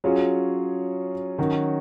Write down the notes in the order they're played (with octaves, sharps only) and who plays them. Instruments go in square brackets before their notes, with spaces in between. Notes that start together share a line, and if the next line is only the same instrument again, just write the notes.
[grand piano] F#3 C#4 F4 G#4
D#3 F#3 C#4 F#4